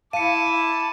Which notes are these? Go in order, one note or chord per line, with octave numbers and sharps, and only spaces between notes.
E4 F5 A5 D6 C#7 D#7